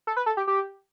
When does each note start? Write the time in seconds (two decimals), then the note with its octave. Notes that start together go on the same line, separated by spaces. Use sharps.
0.07 A4
0.17 B4
0.26 A4
0.37 G4
0.47 G4